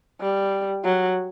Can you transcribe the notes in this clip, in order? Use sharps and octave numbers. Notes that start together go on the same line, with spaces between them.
G3
F#3